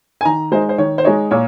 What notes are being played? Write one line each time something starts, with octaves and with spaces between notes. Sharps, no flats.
G#5
D#3 A#5
G#3 D#4 C5
C5
D#3 C#5
C5
G#3 D#4 C#5
A#2 C#5